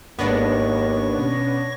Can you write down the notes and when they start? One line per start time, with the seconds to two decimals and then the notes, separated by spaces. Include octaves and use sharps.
0.19 G#1 D#2 G#2 B3 D4 C#5 C#6 A#6
1.18 B2 C#4